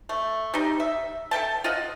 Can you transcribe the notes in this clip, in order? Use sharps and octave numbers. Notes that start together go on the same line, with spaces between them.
A3
G3 D#4
E5
A4 E5 G5 A5
F4 D#5 F#5